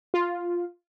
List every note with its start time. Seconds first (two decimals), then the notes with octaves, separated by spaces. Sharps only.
0.14 F4